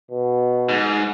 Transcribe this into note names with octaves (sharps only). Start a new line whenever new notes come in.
B2
G#2